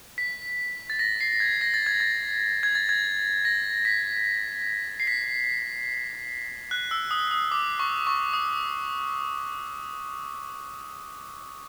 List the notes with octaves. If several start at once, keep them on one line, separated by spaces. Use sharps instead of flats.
B6
A6
A#6
C7
G#6
A#6
A6
G#6
A6
G#6
A6
G#6
A#6
B6
C7
B6
F#6
E6
D#6
D#6
D6
C#6
C#6
D#6